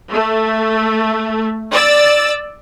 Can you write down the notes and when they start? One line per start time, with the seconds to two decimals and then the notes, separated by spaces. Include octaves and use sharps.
0.11 A3
1.72 D5 E6 A6